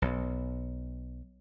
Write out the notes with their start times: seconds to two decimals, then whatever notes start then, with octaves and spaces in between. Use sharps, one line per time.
0.02 B1